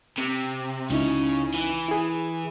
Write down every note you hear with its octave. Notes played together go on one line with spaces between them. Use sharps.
C3
C#2 C#3 C#4 D#4 E4
E3
E4 G#4